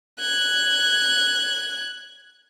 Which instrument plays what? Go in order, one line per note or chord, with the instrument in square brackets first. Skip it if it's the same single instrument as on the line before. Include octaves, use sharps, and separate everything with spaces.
[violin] F#6 G#6